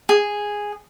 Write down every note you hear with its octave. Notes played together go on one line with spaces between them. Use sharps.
G#4